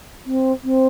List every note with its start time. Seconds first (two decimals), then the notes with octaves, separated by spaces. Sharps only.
0.26 C4
0.63 C4